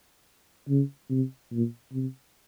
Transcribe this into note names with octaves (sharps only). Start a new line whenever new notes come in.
C#3
C3
A#2
C3